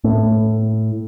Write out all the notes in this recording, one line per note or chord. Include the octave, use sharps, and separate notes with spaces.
A2